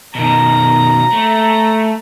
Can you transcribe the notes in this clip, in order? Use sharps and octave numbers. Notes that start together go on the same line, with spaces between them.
B2 D#3 A#5
A3